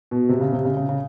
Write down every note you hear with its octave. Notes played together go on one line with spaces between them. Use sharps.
B2
C3
C#3
C3
C#3
C#3
C#3